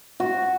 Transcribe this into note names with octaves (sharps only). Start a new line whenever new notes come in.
F#4